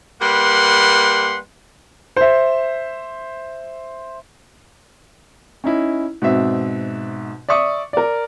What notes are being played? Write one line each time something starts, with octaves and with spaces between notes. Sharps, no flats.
G3 A#3 B4 F#5 C6
C5 E5
C#4 D#4 E4
G#2 B2 C4 E5
D5 E5 C#6 D#6
A#4 D5